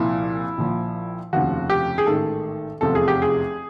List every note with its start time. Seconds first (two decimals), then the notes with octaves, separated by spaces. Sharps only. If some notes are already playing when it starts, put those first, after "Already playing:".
Already playing: C2 A#2 F3 E4
0.58 A#1 A#2 F3
1.33 F1 D#2 C#3 F3 F#4
1.70 G4
1.98 G#4
2.06 A1 G#2 D#3 A4
2.81 F1 E2 C3 F3 A4
2.95 G#4
3.08 G4
3.22 G#4